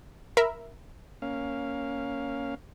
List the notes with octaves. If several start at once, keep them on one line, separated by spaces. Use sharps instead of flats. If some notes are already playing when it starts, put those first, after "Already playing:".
A#4 E5 B5
A#3 C#4 F5